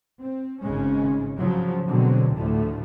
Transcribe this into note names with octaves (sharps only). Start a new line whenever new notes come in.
C4
G#1 C#3 G#3 C#4
C#3 F3 F#3
B2 D3 F#3 G#3 C4
D2 A2 D3 F3 A3